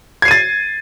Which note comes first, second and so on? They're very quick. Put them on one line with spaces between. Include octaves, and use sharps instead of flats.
G#6 C7 D#7 A6